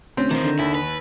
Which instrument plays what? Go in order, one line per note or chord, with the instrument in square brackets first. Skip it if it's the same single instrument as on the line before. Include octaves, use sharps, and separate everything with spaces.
[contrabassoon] D2 [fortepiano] C4 [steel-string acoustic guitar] C#4
[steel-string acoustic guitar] D#3 [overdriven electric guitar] E3 C5
[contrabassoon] D3
[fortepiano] D#2 [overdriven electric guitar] E4
[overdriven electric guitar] B4